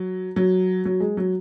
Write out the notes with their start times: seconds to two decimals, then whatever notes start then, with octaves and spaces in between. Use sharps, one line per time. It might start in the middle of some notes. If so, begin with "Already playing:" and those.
Already playing: F#3
0.36 F#3
0.85 F#3
1.00 G#3
1.17 F#3